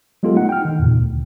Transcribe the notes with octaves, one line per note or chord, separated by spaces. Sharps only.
F#3 G#3 B3 F4 G4 A4
A3 D#4 F#5
G5 F6
D#3 D#4
E2 A#2 C#3
D2